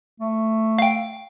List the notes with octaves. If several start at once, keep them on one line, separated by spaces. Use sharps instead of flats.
A3
F5 G5